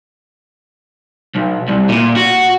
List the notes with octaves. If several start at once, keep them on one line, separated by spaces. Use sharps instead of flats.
B1
C2
A#2
F#4